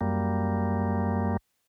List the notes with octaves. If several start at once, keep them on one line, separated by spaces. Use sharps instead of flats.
F#2 G3 A#3